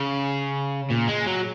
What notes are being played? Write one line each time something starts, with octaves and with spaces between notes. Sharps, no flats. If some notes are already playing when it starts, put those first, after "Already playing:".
Already playing: C#3
A#2
G#3
F#3